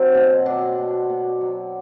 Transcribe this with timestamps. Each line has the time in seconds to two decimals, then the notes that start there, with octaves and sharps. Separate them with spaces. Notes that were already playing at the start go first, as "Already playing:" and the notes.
Already playing: F#3 C4
0.15 B2
0.46 B2 D4
0.78 B2
1.10 B2
1.41 F#3